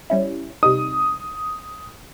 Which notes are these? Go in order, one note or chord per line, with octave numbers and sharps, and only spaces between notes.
G3 C#4 E4
C3 G3 D#4 D#6